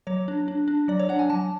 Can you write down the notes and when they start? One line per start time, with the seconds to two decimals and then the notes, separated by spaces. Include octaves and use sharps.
0.07 F#3 C#5
0.28 D4
0.48 D4
0.68 D4
0.88 F#3 D5
0.99 C#5
1.09 D4 F#5
1.19 G#5
1.30 F#3 A5